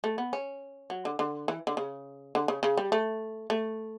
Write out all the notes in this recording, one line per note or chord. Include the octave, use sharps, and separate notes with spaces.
A3
B3
C#4
F#3
D3
D3
E3
D3
C#3
D3
C#3
C#3
G3
A3
A3